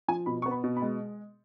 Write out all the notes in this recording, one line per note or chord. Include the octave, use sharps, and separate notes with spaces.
F3 G#5
B2 B5
B3 C#6
B5
B2
B5
G#3